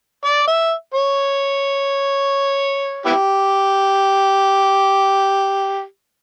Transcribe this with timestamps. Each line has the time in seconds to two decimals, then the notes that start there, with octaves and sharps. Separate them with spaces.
0.25 D5
0.47 E5
0.94 C#5
3.06 B3 E4 G4